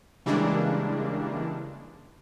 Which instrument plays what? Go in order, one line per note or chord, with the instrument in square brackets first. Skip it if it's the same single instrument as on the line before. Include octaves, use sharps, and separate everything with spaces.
[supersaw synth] C#3 E3 G3 G#3 A#3 D4